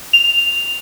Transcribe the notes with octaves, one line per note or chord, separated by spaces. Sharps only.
F7